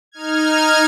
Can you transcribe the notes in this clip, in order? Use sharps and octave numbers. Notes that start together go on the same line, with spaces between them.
D#4 F6 G#6